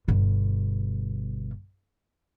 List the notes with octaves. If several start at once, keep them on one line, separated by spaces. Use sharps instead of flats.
G1 B2